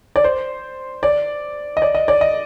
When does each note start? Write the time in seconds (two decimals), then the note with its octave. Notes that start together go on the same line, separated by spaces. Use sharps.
0.16 D5
0.24 C5
1.03 D5
1.77 D#5
1.82 D5
1.95 D#5
2.08 D5
2.21 D#5